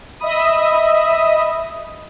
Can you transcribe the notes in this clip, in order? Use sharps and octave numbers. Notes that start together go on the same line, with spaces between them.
D#5 E5 B5 D#6